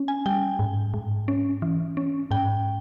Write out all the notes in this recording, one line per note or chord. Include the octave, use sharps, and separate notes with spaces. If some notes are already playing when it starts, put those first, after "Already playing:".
Already playing: C#4
G#5
G3 G5
G#2
G#2
C#4
E3
C#4
G#2 G5